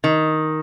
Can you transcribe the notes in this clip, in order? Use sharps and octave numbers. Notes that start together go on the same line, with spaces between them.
D#3